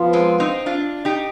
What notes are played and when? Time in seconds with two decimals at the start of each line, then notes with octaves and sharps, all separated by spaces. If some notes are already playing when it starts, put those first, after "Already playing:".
Already playing: F3 B3 F4
0.13 G#3 C4
0.40 C4 D#4
0.66 D4 F4
1.05 D#4 G4